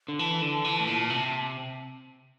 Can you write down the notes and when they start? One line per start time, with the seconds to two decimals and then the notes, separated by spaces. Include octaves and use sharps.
0.08 D3
0.19 E3 A5
0.42 D3
0.65 E3
0.80 A2
0.87 A#2
1.10 C3